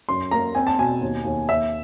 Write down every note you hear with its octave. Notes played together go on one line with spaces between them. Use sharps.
F#2 C6
A#3 A#5
C4 G#5
A5
B2 G#5
D#2
D#2
D#2 E5